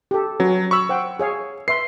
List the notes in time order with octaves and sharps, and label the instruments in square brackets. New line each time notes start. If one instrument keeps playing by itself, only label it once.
[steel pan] G4 A4
[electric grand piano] F#3 [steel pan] C#4 B4
[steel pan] B5 [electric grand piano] C#6 E6
[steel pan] C5 F#5 G5
G#4 C#5 F5
[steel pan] B4 E5 C6 [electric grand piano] C7